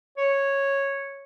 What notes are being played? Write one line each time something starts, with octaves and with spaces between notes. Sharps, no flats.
C#5